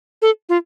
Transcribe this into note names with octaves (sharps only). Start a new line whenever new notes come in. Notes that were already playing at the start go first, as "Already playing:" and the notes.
A4
F4